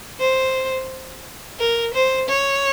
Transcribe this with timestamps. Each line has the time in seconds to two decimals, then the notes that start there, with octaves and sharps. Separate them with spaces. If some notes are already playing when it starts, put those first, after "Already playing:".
0.20 C5
1.60 A#4
1.94 C5
2.29 C#5